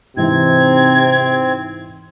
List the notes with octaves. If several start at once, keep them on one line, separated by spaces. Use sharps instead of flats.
G#2 C3 E3 C4 G#6